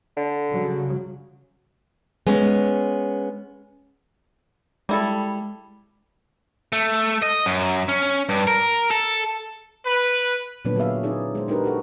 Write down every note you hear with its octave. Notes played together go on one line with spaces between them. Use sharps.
D3
C#3 F#3
G#3 B3 C#4
G3 G#3 E4 A4
A3
D#5
F#2
C#4
G2
A#4
A4
B4
A#2 D3 F#3 B3 D4 B4
F#3 F#4 G#4 E5 F5
C#4 D#4 G#4 D5
G#3 C5
D4 D#4 G4 A#4 B4
D#4 F#4 A4